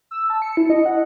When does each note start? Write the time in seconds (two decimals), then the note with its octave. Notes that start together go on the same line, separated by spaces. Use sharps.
0.11 E6
0.30 A5
0.42 C#7
0.57 E4
0.70 D#5
0.85 F#5